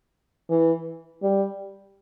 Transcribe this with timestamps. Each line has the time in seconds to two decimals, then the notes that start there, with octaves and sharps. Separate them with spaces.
0.50 E3
1.23 G3